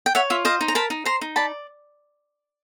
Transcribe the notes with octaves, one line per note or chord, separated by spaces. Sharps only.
G5
C#5 E5 F#5
F4 E5
C5 D#5 F5
D#4
A#5
A#4 A5 B5
D#4
C5 A#5 C6
D#4
D5 A5 B5